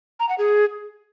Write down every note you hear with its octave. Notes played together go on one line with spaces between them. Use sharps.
A#5
F#5
G#4